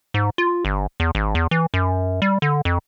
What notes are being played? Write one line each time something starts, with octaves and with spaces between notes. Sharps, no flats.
G#2
F4
G1
E2
G#1
E2
E3
F#2
G3
D3
F2